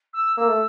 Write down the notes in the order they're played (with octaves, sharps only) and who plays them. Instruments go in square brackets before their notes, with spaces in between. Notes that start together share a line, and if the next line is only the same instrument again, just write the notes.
[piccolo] E6
[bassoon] A#3 [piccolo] E6
[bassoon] A3